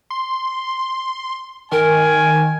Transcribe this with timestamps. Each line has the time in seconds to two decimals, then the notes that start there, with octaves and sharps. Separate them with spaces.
0.10 C6
1.72 D#3 A#4 G#5